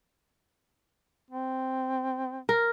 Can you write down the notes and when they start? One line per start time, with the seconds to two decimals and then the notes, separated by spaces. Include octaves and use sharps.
1.30 C4
2.49 A#4